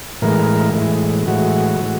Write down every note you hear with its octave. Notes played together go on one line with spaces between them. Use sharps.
A2 E3 G#3 A#4
A2 E3 G#3
A2 E3 G#3 F#4
A2 E3 G#3